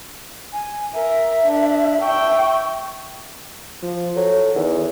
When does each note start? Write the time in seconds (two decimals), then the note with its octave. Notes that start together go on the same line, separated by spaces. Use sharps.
0.53 G#5
0.94 A#4 E5
1.45 D4
2.02 E5 G5 C#6
3.82 F3
4.16 F#3 A4
4.55 E2 D#3